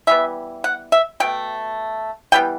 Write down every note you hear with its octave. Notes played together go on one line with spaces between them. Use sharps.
E3 G3 B3 E5
F#5
E5
B2 A3 G5
E3 G3 B3 G5